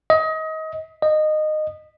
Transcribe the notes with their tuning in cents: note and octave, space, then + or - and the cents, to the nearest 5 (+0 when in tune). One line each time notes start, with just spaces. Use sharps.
D#5 +30
D#5 -15